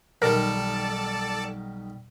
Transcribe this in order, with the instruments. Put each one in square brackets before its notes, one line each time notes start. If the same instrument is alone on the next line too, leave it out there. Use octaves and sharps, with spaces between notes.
[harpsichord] B1 D#3 G3 [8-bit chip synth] A4 D5 A5 [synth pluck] A#4